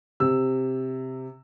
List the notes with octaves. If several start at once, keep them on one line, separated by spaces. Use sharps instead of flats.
C3 E6